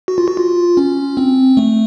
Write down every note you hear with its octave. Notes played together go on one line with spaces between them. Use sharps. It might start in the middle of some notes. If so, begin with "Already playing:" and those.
F#4
F4
F#4
F4
C#4
C4
A3